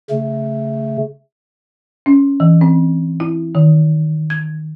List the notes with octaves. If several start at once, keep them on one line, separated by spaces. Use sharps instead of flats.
C#3 A3
C#4
E3
C4
E4
D#3
G#6